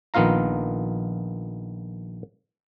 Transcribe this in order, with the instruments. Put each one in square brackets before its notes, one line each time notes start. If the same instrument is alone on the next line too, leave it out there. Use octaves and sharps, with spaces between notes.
[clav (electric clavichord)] A#1 D#3 B3 F4 F5 A#5